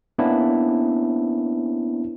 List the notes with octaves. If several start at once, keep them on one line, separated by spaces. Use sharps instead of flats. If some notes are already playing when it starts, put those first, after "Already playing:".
A#3 B3 C#4 D4 E4